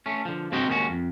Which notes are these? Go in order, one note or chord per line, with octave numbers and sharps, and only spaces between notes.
A3 C#4
D3 F3
G2 C4 F#4 D#5 G5
D#2 D#3 G#3 C#4 F#4
F2